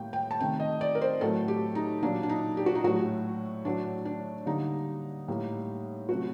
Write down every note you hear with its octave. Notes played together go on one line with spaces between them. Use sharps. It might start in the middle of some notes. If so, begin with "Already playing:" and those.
Already playing: A2 G3 A#3 G5
G5
A5
C3 D#3 A3 G5
D#5
D5
A#4
C5
A2 F#3 A3 A4
G4
D#4
A#2 F#3 A#3 D4
D4
D#4
G4
F#4
D#4
A2 F#3 A3 F#4
A2 F#3 A3 D4
D4
D3 G3 A#3 D#4
A2 G3 A#3
C3 F#3 A3 F#4